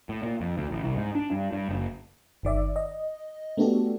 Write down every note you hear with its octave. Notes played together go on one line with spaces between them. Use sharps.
A2
A#2
F2
D2
A1
C2
G#2
D4
G2
G2
F#1
G1 D#3 D5 E5
D#5
A3 B3 D4 F#4 G4 A4